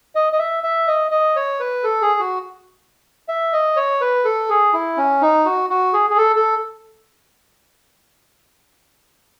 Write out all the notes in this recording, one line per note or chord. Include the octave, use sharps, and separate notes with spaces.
D#5
D#5
E5
E5
D#5
D#5
C#5
B4
A4
G#4
F#4
E5
D#5
C#5
B4
A4
G#4
E4
C#4
D#4
F#4
F#4
G#4
G#4
A4
A4